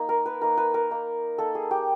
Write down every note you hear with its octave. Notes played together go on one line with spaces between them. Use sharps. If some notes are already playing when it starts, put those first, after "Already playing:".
Already playing: A#3 D#4
A#4
B4
A#3 D#4 A#4
B4
A#4
A#3 D#4
A#3 D#4 A4
G#4
G4